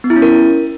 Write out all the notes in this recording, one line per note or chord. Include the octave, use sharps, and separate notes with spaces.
B3
E4
C#4
A#4